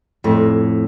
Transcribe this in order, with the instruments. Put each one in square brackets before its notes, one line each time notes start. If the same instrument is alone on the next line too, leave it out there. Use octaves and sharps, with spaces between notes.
[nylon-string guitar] F2 A2